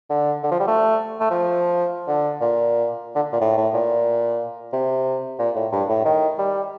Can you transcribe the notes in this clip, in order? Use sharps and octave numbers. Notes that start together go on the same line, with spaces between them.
D3
D3
F3
G3
A3
A3
F3
D3
A#2
D3
A#2
A2
A2
A#2
C3
A#2
A2
G2
A2
D#3
G3